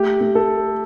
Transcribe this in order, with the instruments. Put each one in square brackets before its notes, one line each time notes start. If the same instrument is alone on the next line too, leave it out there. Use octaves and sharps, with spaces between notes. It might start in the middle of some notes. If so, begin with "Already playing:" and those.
Already playing: [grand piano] A3 G4
A3
A4